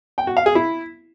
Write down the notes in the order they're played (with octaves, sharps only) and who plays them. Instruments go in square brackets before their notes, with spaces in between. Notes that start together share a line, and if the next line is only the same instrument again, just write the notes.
[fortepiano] G5
F#4
F5
G#4
E4